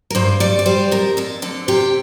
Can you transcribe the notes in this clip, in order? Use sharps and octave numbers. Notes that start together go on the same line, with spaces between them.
A#4
G2 C5
G3 D5
D5
G3 C5
F2 A#4
F2 A4
D3 A4
C3 G4